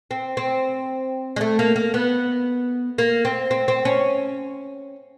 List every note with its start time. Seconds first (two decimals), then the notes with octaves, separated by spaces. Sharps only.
0.11 C4
0.37 C4
1.36 G#3
1.41 A3
1.59 A#3
1.76 A#3
1.94 B3
2.98 A#3
3.25 C4
3.51 C4
3.68 C4
3.85 C#4